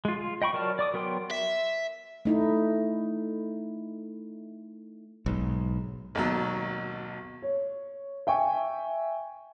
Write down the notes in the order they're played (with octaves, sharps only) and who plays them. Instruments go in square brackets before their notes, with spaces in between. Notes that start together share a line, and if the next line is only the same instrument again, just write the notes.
[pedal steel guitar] G#3 F4
F4
D#5 G5 B5 C#6
F#3 A#4 D5 A5 F6
D5 D6 D#6
F#3 B3 A#4 G5 C6
[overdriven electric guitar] E5
[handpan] A3 D#4 E4
[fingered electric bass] B1 G#2
[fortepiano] G#1 D#2 B2 F#3
[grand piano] C#5
E5 G5 G#5 C#6